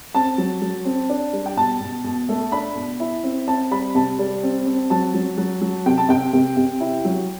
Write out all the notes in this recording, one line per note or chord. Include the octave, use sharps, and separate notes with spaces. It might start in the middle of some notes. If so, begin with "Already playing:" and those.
C4 A5
F#3
F#3
C4
D4
G3
G5
B2 A5
B2
B2
A3
D4 B5
B2
E4
C4
C4 A5
G3 B5
C3 A5
G3
C4
C4
F#3 A5
F#3
F#3
F#3
C3 G5
A5
C3 G5
C3
C3
E4
F#3